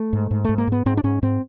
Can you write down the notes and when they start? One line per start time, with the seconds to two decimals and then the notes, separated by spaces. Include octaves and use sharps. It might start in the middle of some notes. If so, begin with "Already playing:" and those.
Already playing: A3
0.13 G#2
0.31 G#2
0.45 G#2 A3
0.58 A#3
0.67 G#2 B3
0.86 G#2 C4
0.97 D4
1.04 G#2 C#4
1.23 G#2 C4